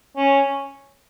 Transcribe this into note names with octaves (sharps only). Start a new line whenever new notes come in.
C#4